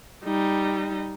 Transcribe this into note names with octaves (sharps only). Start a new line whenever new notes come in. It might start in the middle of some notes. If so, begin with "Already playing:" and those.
G3 D#4